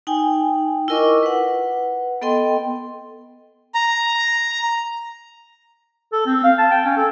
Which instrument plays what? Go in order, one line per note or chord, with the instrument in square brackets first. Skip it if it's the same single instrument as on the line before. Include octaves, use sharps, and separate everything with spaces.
[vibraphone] D#4 G5 G#5
E4 F4 A#4 D#5 C#6 D6
B4 F#5
B3 A4 D#5 G5 C6
[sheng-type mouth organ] A#5
[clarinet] A4
C4
F5
A5
G5
C#4
A4